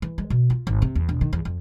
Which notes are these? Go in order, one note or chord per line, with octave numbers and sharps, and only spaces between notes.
E3
G#3
B2
F4
G#1
C3
E2
E1
D#3
E2
F2